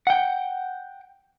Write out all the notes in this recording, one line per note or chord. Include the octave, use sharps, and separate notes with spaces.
F#5 G5